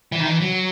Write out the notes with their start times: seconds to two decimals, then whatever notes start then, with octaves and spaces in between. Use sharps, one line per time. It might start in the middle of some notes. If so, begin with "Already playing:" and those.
0.12 E3
0.20 D#3
0.27 E3
0.41 F#3